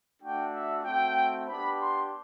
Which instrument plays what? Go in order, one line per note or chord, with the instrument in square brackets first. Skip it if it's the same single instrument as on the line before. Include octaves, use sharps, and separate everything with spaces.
[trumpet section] A3 D4 F#4 G5
E5
A3 C4 F#4 G5
B3 D4 G4 B5
C6